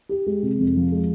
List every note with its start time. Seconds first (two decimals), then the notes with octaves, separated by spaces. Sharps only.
0.09 G4
0.26 G#3
0.42 C3
0.59 F2
0.76 F3
0.92 G#3